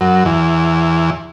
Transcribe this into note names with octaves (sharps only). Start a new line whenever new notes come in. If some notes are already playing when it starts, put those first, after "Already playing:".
F#2
E2